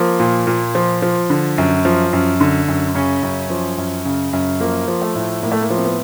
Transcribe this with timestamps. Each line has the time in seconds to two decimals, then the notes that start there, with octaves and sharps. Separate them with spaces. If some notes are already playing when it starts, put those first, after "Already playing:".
Already playing: F3 A#3
0.20 A#2
0.47 A#2
0.75 F3
1.02 F3
1.30 D3
1.58 F#2
1.85 F3
2.13 F#2
2.41 D3
2.68 F#2
2.95 C#3 C#4
3.23 F#2
3.50 F3
3.78 F#2
4.05 C#3
4.33 F#2
4.60 F3 A#3
4.88 F3
5.02 A3
5.15 A2
5.43 A2 A#3
5.52 A3
5.61 A#3
5.70 F3
5.77 C4
5.85 B3